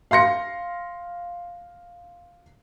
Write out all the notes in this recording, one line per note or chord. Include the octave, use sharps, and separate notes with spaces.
F5 C6 A#6 C#7